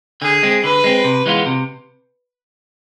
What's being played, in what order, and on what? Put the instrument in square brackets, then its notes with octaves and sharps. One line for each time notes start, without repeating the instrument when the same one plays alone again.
[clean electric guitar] D3 [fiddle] G#4
[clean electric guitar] G#3 C4
[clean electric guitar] D3 [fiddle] B4
[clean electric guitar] G#3 C4
C3
E3 G#3 B3 F4
C3